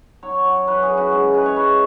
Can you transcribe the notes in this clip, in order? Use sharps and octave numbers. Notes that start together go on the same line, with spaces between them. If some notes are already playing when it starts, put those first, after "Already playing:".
F#3 C#5
F#3
E3 B4
G#4
F#2
F#4
G#3 G#4
G#3 B4
C#5
E3 B4